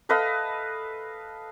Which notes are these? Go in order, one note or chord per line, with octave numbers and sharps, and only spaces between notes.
A4 B4 D#5 F5